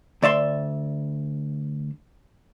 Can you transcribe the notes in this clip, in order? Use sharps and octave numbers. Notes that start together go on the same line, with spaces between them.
D2 D5 E5 C6